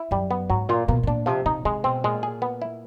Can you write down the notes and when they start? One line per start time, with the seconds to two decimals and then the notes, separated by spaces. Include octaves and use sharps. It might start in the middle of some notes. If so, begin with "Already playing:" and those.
Already playing: E4
0.11 F#2 G3
0.31 B3
0.50 G#2 F#3
0.69 A#2 F4
0.88 B2 A#3
1.03 B2
1.07 A#2 D4
1.26 C3 F3
1.46 C3 D#4
1.65 C3 G#3
1.84 B2 C4
2.04 A#2 G#3
2.23 G#4
2.42 B3
2.62 E4